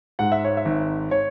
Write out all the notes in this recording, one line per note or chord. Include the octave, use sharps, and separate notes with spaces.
G#2 F#5
E5
C#5
E5
G#1
C#5